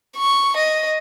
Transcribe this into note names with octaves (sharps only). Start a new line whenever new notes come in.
C#6
D#5